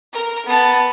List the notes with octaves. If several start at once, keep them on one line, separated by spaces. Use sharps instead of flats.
A#4
B3 A5